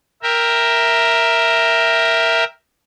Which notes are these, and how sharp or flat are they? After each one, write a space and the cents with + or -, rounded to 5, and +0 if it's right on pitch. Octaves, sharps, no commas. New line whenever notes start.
A#4 +0 E5 +0 G5 +10